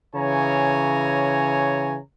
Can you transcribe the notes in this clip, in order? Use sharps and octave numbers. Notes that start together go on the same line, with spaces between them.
C#3 E3 C#5 G#5 A#5